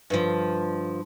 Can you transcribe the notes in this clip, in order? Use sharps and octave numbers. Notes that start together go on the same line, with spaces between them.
G2 D3 F3